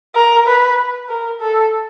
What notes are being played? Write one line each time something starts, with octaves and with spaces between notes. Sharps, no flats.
A#4
B4
A#4
A4